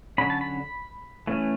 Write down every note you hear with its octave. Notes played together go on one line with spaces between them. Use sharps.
D3 F#3 C#4 B5
A5
B5
E3 A3 C#4